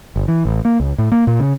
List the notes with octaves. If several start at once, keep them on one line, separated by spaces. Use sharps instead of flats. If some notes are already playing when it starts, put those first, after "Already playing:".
G1
E3
A1
A#3
C#2
A2
A#3
A#2
C#3